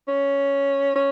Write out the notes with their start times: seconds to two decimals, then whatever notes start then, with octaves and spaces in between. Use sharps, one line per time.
0.08 C#4
0.96 C#4